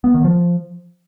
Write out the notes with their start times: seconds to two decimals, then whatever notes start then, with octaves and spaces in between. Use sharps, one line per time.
0.04 B3
0.14 D#3
0.24 F3